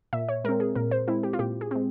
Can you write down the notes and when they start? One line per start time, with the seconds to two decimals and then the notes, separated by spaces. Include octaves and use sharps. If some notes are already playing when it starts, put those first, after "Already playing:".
0.13 A#2 E5
0.29 C#5
0.44 G#3 C4 A#4
0.60 G#4
0.75 A#2 A#4
0.91 C5
1.08 G#3 C4 E4
1.23 G4
1.33 F4
1.39 A#2 G4
1.61 G#4
1.71 G#3 C4